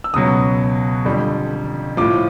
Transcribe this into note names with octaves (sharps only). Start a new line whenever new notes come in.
E6
C#2 B2 F#3 D#6
F2 D3 G3
A2 F3 D6